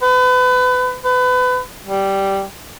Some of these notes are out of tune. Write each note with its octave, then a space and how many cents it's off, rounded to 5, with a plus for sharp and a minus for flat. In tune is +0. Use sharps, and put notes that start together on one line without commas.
B4 +30
B4 +30
G3 -5